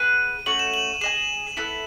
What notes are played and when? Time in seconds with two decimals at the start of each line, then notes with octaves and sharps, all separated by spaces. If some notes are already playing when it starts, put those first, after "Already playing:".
Already playing: G#4 B4 F#5 D#7
0.46 A3 C#4 F#4 F#7
0.59 E7
0.74 F#7
1.01 G#4 D#5 G#5 E7
1.57 B3 E4 A4